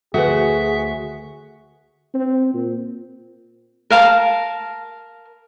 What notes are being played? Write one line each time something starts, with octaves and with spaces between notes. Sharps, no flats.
D2 F#4 G#4 A4 B4 E5
C4
A#2
A#4 F5 A5 A#5